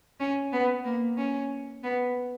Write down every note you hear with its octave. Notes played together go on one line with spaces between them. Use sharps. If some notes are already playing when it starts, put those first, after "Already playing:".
C#4
B3
A#3
C#4
B3